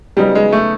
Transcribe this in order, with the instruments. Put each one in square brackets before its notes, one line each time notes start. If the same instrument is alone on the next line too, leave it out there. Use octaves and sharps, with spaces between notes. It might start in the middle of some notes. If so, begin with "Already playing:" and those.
[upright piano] C#3 F#3 B3 D#4 [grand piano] G3
[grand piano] G#3
A3